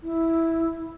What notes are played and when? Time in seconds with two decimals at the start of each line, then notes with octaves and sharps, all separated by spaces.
0.01 E4